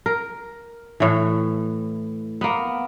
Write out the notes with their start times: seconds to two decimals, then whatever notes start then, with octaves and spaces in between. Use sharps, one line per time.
0.06 A#4
1.00 A2 E3
2.41 A#3 B3